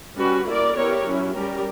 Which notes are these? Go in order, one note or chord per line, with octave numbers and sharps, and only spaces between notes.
G3 C#4 F#4 B4
A#3 E4 A#4 D5
B3 E4 G4 A#4 C#5
F#3 C#4 E4
G3 C#4 G4 A#4